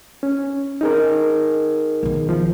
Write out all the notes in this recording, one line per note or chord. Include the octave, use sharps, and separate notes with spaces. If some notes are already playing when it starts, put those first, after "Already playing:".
C#4
D#4 G#4 A#4
B1 D#3
F3